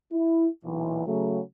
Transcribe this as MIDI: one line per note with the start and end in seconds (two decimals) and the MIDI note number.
0.13 0.47 64
0.65 1.06 35
0.65 1.06 46
0.65 1.06 52
1.06 1.41 49
1.06 1.41 54
1.06 1.41 57